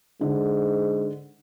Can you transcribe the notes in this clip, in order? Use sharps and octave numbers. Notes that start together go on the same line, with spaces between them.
G#2 D3